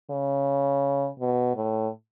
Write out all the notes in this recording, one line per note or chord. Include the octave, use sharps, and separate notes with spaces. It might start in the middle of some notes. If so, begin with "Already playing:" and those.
C#3
B2
A2